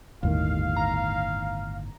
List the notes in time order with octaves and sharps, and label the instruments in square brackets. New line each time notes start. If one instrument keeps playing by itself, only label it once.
[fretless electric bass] G1 A2 D#3 [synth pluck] D#2 [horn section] F5
[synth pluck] A#5